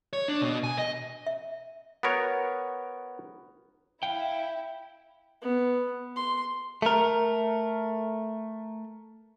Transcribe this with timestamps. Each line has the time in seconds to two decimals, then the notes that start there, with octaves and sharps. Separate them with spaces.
0.13 C#5
0.28 D4
0.41 B2
0.64 G#5
0.78 D#5
1.27 E5
2.03 B3 F#4 A#4 C#5
4.03 E4 F5 G5
5.42 B3
6.16 C6
6.82 A3 A#4